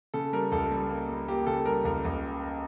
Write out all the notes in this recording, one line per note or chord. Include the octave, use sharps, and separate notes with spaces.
C#3 A4
G3 A#4
C#2 A4
G3
A#3
G3
A#3 G4
C#3 A4
G3 A#4
C#2 A#4
C#2